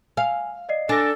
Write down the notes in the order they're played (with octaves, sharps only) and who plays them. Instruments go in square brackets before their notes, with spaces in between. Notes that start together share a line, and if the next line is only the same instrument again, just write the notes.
[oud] F5 [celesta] G#5
[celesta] D5 D#5 C7
[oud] D4 [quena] A4 [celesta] G#5 A#6